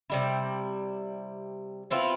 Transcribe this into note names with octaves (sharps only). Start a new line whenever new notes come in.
C3 G3 E4
B3 C4 E4 F4